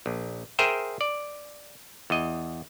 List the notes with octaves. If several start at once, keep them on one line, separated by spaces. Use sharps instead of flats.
A#1
G#4 A#4 C5 E5 G5
D5
E2 D#5